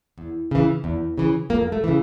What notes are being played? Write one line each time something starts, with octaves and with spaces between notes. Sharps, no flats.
E2
C#3 E3
E2
C#3 E3
F2 A#3
A3
C#3 E3